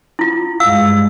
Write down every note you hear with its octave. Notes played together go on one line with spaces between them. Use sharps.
E4 F4
G2 G#3 F5 E6